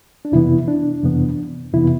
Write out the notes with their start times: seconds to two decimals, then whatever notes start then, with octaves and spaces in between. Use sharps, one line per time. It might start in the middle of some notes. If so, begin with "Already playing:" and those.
0.25 D4
0.32 F2 C3 E3 B3 E4
0.68 D4
1.03 F2 C3 E3 B3
1.73 F2 C3 E3 B3 E4